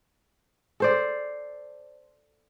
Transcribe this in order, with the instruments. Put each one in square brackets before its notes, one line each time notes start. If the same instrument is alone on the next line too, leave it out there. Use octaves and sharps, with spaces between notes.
[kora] A4 C5 D5